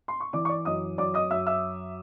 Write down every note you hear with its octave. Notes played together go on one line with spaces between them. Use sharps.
C6
C#6
E3 D5 D6
C#6
D5 D6
F#2 D#5 D#6
F#2 D5 D6
D#5 D#6
F#2 E5 E6
E5 E6